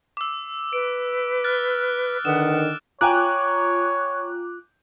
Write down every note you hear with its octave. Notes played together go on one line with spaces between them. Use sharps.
D6 E6
B4 D7
F6 F#6 A6
D3 D#3 B4 F#5 D#6 E7
F4 C#5 G5 G#5 A#5 D6 F#6